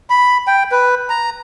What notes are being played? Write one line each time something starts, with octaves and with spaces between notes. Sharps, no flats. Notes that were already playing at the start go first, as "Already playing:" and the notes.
B5
G5
B4
A#5